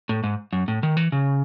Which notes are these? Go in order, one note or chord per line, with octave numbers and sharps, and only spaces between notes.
A2
G#2
F#2
A2
D#3
E3
C#3